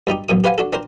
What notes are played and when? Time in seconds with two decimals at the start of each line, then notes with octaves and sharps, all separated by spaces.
0.07 G2 G3 D#4 G4
0.29 A1 F#2 B2 D#6
0.44 G4 B4 C5 F5 F#5 G#5
0.58 D4 F#4 A4
0.73 C4 D4 A#4 C5